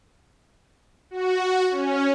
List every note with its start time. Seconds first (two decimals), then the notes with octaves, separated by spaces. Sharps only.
1.11 F#4
1.71 C#4